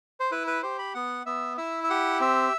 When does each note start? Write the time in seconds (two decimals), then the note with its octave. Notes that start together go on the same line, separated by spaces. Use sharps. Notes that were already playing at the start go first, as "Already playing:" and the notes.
0.20 C5
0.31 E4 B4
0.47 B4
0.63 G4 C5
0.79 B5
0.94 B3 F#5
1.26 B3 E5
1.57 E4 E5
1.84 E5
1.90 G4 F#5
2.20 C4 E5